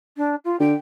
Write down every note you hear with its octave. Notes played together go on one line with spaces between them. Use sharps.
D4
F4
D3 G5